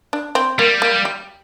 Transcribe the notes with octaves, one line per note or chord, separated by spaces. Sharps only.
D4
C4
G3 A#3
A#3
G4